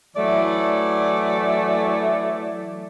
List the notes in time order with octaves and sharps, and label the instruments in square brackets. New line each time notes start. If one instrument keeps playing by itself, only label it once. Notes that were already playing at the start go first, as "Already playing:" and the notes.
[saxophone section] E3 F#3 A3 D5